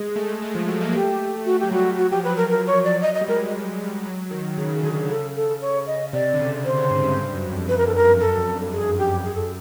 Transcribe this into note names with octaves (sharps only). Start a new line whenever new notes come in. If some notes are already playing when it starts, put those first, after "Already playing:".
Already playing: G#3 G#4
A3
G#3
F3
F#3
A#3
A3 G4
A3 F#4
F#3 G4
G3 F#4
F#3 F#4
F3 G4
F#3 B4
A#4
A#4
C#5
D5
F#3 D#5
D#5
G3
G#3 A#4
F#3
D#3
C#3 G#4
C#3
D3 G#4
D3
C#3 A4
A4
C#5
D#5
C3 D5
D3
C#3
D3 C5
C#3
G#2
G2
G2
F#2
F2
B4
A#4
A4
A#4
F#2 A4
F2
G2
G#4
G4
F#2 G#4
A4